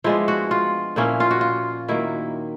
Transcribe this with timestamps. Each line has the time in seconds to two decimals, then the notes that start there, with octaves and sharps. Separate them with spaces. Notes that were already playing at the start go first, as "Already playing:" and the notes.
0.04 F3 G#3 B3 D4 E4
0.28 F#4
0.51 F4
0.96 A#2 F3 A#3 C#4 E4
1.20 F4
1.31 F#4
1.41 F4
1.88 D#3 F#3 A#3 E4